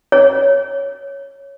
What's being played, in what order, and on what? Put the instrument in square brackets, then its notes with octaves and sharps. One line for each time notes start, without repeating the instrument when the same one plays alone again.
[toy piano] C#5